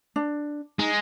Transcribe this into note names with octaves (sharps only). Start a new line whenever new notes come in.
D4
G#3 D#4